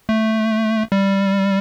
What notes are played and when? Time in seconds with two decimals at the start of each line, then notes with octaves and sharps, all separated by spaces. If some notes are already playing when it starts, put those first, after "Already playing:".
0.09 A3
0.92 G3